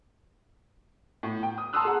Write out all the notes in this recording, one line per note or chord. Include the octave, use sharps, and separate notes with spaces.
A2
G5
D#6
A5 A#5 C6 D#6 E6 F#6
G#4 F#5